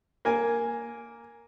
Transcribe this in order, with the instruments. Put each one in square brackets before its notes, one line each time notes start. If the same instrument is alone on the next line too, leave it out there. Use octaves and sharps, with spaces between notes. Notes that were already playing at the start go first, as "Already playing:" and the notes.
[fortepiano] A#3 G#5